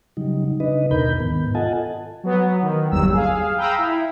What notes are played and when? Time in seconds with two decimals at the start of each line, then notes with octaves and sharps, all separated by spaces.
0.17 C#3 F#3 G3 D#4
0.60 C#3 D4 D#4 B4 D#5
0.91 D#2 B2 A#4 B5 G6
1.20 G#2 D#3 B3
1.55 F4 A4 D#5 F#5 G#5 A5
2.23 F#3 B3
2.63 D#3
2.91 G1 D#2 F#3 G3 E6
3.13 G#4 F5
3.57 F5 G5 A#5 B5 D#6 E6
3.78 E4